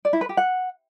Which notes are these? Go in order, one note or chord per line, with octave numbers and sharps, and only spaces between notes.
D5
E4
B4
G4
F#5